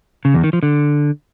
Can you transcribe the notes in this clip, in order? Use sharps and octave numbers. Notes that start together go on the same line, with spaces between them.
C#3
E2
D#3
F3
D3